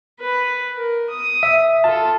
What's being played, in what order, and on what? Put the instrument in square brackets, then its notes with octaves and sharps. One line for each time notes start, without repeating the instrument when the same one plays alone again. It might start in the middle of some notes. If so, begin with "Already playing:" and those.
[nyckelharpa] B4
A#4
D#6
[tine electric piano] E5
[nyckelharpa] F4 A4 [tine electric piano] A5